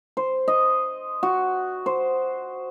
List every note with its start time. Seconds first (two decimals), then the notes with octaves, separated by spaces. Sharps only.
0.17 C5
0.48 D#5
1.23 F#4
1.86 C5